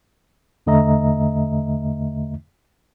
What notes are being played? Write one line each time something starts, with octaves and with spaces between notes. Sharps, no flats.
E2 D3 A3 D#5 E5 A#5